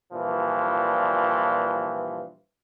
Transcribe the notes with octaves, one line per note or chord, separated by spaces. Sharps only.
G2 A#2 E3 F3